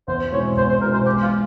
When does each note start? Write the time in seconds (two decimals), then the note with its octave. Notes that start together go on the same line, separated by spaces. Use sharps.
0.08 E2 C5
0.32 B2 G#3 C4 E4 C#5
0.57 E2 C5
0.69 C5
0.81 B2 G#3 C4 E4 A#4
0.94 C5
1.06 G#3 G4
1.23 F4